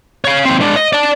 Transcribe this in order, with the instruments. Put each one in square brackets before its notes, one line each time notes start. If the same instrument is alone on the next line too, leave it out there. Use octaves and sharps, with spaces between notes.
[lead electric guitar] C#5 F5
D#2 C4
G#3 D4
D#5
D5 A5